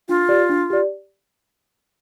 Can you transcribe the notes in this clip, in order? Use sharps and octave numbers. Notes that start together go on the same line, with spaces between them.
D4 F4
G4 D5
D4
G4 D5